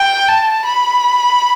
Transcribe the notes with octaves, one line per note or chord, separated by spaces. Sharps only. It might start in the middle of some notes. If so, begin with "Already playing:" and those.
Already playing: G5
A5
B5